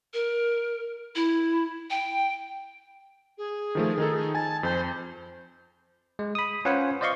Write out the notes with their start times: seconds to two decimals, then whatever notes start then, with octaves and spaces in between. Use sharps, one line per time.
0.14 A#4
1.16 E4
1.90 G5
3.38 G#4
3.75 D#3 F3 A3
3.98 D#3 D#4 A4
4.35 G#5 A5 A6
4.63 F2 C5
6.19 G#3
6.35 B5 D#6
6.65 C#4 F4 B4 C5 F#5 G#5
7.01 C5 D5 D#5 F5 C6 C#6